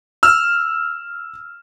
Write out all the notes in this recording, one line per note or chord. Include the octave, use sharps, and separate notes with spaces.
E6 F6